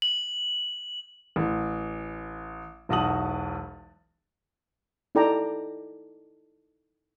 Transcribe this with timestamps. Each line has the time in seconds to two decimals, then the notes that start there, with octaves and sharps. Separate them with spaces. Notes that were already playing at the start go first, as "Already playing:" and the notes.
0.02 F#7
1.36 A1
2.89 E1 B1 F#4 A5 D#6 F#7
5.15 D#4 E4 A4 D5 G5 A#5